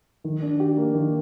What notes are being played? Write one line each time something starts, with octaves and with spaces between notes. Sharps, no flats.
D#3
D4
G4
A#3
D#3